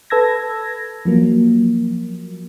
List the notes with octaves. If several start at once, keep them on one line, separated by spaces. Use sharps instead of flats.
A4 B4 A5 E6 G#6 A#6
F3 F#3 A#3